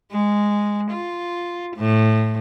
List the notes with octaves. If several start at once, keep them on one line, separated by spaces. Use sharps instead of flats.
G#3
F4
A2